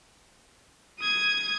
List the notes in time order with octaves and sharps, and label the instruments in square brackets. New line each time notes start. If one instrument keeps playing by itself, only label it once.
[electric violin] D#6 G#6